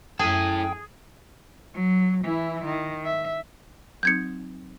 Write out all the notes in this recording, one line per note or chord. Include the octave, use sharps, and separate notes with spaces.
F#2 E4 G#4 A4 G5 G#5
F#3
E3 E4
D#3
E5
F#3 C4 D#4 G6 G#6 C#7